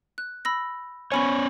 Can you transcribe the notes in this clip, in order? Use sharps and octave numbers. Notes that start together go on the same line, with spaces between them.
F#6
B5 E6 A#6
B3 C#4 C#5 G#5 B5 C#6